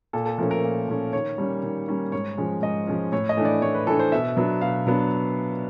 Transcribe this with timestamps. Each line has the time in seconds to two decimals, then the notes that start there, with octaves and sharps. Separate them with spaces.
0.13 A#2 A4
0.26 A4
0.38 F3 A3 C#4 A#4
0.51 A#4
0.63 A#2
0.88 F3 A3 C#4
1.13 D#3 C#5
1.38 G3 A#3 C#4
1.63 D#3
1.88 G3 A#3 C#4
2.12 G#2 C#5
2.37 F3 G#3 C#4
2.62 G#2 D#5
2.87 F3 G#3 C#4
3.12 A2 C#5
3.29 D#5
3.37 E3 A3 D4
3.45 D5
3.62 A2 C#5
3.74 B4
3.87 E3 A3 D4 A4
3.99 C5
4.12 B2 E5
4.37 F#3 B3 D4
4.61 B2 F5
4.87 F#3 B3 D4